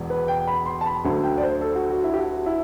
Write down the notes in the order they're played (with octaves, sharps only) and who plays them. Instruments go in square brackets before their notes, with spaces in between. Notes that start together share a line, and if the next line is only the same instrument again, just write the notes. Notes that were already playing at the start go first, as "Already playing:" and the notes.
Already playing: [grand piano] E1 E2
B4
G5
B5
C6
A5
B5
D2 D3 F#3
G5
D5
C5
A4
F#4
F#4
E4
G4
F#4
E4